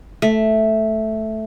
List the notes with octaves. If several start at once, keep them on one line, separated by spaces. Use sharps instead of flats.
A3